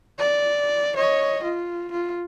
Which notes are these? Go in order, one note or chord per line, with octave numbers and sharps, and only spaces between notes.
D5
C#5 D#5
F4
F4